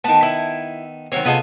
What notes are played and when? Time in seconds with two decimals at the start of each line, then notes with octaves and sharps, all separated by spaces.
0.04 D#3 B3 A5
0.23 E4
1.12 D#3 F#3 C4 C#5
1.25 C3 B3 F4 G#4 A4 D#5